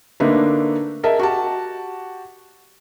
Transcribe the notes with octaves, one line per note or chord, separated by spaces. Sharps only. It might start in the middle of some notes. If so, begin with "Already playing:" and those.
D3 A3 A#3 D4 D#4 B4
G#4 A#4 D#5 E5 A5
F#4 G4 A5